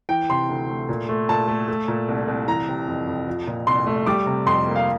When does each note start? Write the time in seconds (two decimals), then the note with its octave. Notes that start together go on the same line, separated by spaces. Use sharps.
0.09 E3 G5
0.29 C3 C6
0.49 D2
0.69 A3
0.89 A#2
1.09 A3
1.29 A#2 A5
1.48 A3
1.68 A3
1.88 A#2
2.08 C2
2.28 C2
2.48 E3 A#5
2.68 C3
2.88 F2
3.07 F2
3.27 F3
3.47 A#2
3.67 C2 C6
3.86 A3
4.06 G3 D6
4.27 C3
4.46 F2 C6
4.66 A#3
4.76 F5